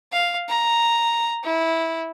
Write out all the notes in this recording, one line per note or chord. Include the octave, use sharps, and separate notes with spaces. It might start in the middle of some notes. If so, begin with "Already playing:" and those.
F5
A#5
E4